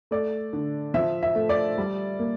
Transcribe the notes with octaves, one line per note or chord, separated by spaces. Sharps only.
A3 D5
D3
F3 E5
E5
A3
D5
G3
A#3